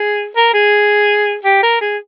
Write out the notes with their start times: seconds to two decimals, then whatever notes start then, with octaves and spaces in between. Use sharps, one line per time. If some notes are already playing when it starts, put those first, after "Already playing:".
Already playing: G#4
0.36 A#4
0.54 G#4
1.44 G4
1.63 A#4
1.81 G#4